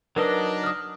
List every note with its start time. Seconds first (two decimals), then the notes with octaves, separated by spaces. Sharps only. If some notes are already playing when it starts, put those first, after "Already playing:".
0.16 F#3 D4 D#4 A#4 B4 D#5
0.64 D#6 F6